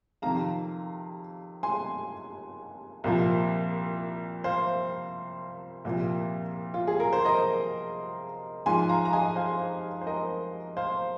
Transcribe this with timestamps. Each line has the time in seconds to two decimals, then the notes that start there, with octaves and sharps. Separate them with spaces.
0.22 F2 C3 D#3 F5 A#5
1.63 G#5 C6
3.04 C2 A#2 F3
4.44 C5 F5
5.85 C2 A#2 F3
6.74 F4
6.87 G#4
7.00 A#4
7.13 C5
7.25 A#4 D#5
8.66 G#2 F3 G#5 C6
8.89 F5 A#5
8.98 C6
9.05 A#5
9.13 D#5 G#5
9.36 C5 F5
10.01 C5
10.06 A#4 D#5
10.77 C5 F5